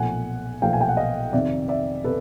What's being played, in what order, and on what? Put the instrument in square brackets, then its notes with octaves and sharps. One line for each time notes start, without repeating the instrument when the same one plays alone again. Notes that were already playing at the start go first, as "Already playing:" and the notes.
Already playing: [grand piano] B1 A#2 F3 A3 F#5 G#5
B1 A#2 F3 A3 F5 G5
G#5
G5
F#5
D#5 F5
F2 C3 D#3 D5 E5
D5 E5
C3 A4 B4